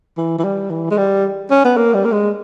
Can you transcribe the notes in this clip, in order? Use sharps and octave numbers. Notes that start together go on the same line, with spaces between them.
E3
E3
G3
E3
G#3
G3
C#4
B3
A#3
G3
A#3
G#3